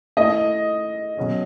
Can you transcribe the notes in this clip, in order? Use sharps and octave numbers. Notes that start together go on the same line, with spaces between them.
A3 E4 A4 D#5
B2 F#3 C#4 G#4